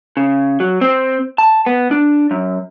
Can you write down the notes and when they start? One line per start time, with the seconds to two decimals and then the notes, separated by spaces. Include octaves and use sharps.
0.17 C#3
0.60 F#3
0.81 C4
1.38 A5
1.66 B3
1.91 D4
2.31 F#2